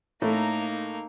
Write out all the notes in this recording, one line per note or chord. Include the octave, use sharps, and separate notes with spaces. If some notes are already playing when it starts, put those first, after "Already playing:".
A2 A3 A#3 D#4